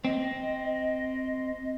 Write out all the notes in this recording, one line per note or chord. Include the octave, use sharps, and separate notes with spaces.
C4 D#5